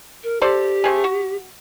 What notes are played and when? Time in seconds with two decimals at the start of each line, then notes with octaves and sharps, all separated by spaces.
0.23 A#4
0.42 G4 A4 C5 D5
0.84 A3 C4 G#4
1.04 F#4